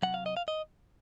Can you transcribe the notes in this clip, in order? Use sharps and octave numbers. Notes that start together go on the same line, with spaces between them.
C3 F#3 F#5
F5
D#5
F5
D#5